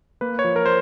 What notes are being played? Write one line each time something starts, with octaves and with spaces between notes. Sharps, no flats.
A#3 B4
C#5
F3
A#4
C5